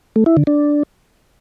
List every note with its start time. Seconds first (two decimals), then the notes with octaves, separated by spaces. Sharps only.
0.16 A3
0.26 E4
0.37 D3
0.47 D4